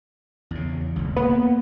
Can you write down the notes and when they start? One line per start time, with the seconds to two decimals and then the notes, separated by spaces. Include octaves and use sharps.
0.51 E2 C#3
0.96 D#1 C#2
1.16 A#3 B3